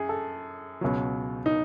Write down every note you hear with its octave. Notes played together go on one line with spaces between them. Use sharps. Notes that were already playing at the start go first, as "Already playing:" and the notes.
Already playing: F#2 G#4
A4
C#2 B2 F#3
D#4